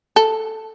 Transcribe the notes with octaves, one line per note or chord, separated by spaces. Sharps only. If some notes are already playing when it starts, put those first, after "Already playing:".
A4